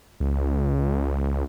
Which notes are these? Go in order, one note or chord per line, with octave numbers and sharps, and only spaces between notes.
C#2